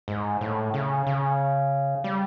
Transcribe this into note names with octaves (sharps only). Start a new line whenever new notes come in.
G#2
A2
C#3
C#3
G3